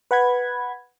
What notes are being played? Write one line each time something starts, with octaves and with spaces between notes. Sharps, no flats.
B4 F#5 B5 G#6